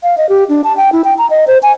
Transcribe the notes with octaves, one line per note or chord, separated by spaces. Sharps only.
F5
D#5
G4
D4
A5
G5
E4
G5
A#5
D#5
C5
G#5